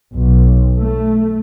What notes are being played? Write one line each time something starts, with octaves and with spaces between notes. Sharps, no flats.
B1
A3